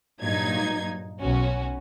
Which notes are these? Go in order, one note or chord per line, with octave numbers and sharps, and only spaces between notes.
G2 A#2 F#3 D#4 G#6
B1 C#4 F#4